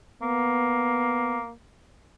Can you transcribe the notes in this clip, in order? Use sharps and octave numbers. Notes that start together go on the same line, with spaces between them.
A#3 B3